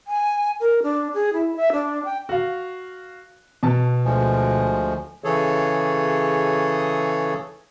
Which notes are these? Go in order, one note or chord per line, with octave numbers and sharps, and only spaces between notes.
G#5
A#4
D4
G#4
E4
E5
D4
G5
F#4 F5
B2 A5
D2 F3 G#3
C#3 E3 G#4 A4 C#5